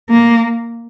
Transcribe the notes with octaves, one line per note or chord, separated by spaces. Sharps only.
A#3